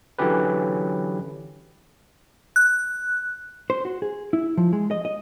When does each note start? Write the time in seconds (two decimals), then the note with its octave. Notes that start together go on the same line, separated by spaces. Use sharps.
0.19 D3 E3 F#3 C#4 G4 B4
2.56 F#6
3.70 C5
3.85 F#4
4.02 G#4
4.33 E4
4.57 F3
4.73 G#3
4.91 D#5
5.05 D#5